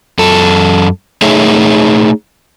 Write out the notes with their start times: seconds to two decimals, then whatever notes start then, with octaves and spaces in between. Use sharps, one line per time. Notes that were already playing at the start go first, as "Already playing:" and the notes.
0.19 F#2 A4
1.22 A3 D#4 G#4 C#5 E5